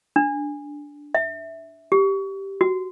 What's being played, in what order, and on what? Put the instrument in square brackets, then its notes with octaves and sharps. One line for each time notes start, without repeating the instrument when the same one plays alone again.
[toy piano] D4
E5
G4
F#4